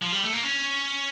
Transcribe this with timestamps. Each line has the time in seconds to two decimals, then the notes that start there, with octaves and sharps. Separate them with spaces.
0.02 F3
0.12 G3
0.23 A3
0.33 A#3
0.43 C#4